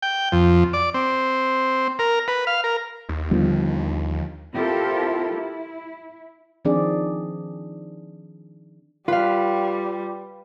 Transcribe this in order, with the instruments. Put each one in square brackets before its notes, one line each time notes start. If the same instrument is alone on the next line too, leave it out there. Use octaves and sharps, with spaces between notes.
[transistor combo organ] G5
F2
D5
C4
A#4
B4
F5
A#4
[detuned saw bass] D#2
[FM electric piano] D3 D#3 F3 [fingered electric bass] G3 B3
[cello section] C4 E4 F4 G4 A4 A#4
E4
[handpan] D#3 F3 C4 D4 G#4 D5
[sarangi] G3 [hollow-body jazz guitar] F4 [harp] B4 F5